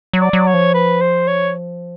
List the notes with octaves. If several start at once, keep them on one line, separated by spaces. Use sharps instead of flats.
F#3
D5
F#3
C#5
F3
B4
C5
C#5